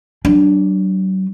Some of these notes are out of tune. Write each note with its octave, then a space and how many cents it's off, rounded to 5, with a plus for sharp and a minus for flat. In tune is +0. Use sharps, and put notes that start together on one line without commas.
F#3 +35 D4 +5